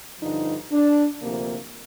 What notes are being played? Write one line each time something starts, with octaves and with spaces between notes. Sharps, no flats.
G2 D3 F3 D#4
D4
D2 C3 F3 A#3